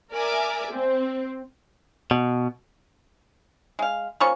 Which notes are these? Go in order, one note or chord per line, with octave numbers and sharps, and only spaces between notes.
A#4 D5 E5 G#5 D6
C4
B2
G#3 F5
F3 A#3 C#4 C#6